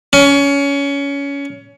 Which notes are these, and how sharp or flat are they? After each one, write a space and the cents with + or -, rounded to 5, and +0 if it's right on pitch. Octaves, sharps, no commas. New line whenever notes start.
C#4 +20